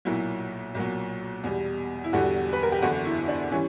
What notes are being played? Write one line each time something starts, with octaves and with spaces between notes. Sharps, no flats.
B1 A#2 F#3 E4
B1 A#2 F#3
E2 B2 G3
E4
E1 E2 D3 G3 F#4
B4
A#4
G4
F#1 E2 D3 F#4
E4
D4
E3 G3 C#4